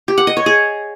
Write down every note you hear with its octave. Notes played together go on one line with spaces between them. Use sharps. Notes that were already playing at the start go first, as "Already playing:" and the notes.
G4
F#5
D#5
C#5
G#4